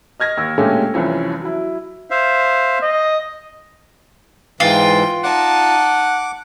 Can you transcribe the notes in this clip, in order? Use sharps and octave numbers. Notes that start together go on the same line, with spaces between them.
D#5 F6 G#6 A#6
D#2 E6
A#2 D3 G#3 A3 C#4 G4
F1 C2 E3 F3 C#4
F#3 E4
C5 E5 F5
D#5
G#2 E3 F4 G5
D#4 F#5 A5 D6